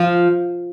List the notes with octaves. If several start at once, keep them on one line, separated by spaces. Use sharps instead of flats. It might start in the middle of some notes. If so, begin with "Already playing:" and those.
Already playing: F3